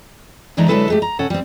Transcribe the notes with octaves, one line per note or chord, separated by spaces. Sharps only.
D2 E3 G#3 D4 D#4 A#5
D3 F#3 G#3 E4 A4 B4
G#3 A3 G4
A#5
C3 C#4 A4 F#5
G3 C4